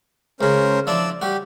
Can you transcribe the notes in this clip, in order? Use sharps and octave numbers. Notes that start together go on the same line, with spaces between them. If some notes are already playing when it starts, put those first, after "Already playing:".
C#2 C#3 C#4 A#4 C5
F3 D4 E4 D5 E6
G3 F#4 G4